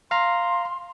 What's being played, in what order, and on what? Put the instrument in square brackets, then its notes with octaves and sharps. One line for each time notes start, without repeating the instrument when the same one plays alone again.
[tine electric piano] F5 A#5 [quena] C6